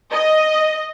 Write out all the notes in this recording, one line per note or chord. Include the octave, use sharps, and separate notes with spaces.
D#5